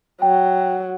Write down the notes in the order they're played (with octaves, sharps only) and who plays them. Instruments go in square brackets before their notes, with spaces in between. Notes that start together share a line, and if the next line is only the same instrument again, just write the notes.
[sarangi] F#3 [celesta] G5